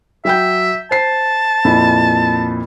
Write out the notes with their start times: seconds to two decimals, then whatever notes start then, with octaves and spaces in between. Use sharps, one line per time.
0.25 F#3 E5 G5 G6
0.91 C5 A5 C7
1.65 F2 A#2 E4